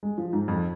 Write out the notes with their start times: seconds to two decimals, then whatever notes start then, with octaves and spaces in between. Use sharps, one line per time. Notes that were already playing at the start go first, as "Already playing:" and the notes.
0.03 G#3
0.18 F3
0.33 G#2
0.48 F2